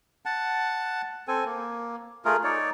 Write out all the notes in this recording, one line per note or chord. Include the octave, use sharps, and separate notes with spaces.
F#5 A5
C4 A4 G#5
A#3
A3 F4 G#4 A#4
D#4 C#5 D5